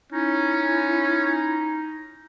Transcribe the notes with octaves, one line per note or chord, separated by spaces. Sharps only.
C#4 D#4 E4